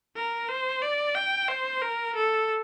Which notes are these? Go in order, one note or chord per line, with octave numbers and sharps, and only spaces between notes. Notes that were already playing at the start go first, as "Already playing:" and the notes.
A#4
C5
D5
G5
C5
A#4
A4